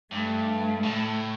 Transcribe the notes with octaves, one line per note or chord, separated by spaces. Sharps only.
G2 A3
A2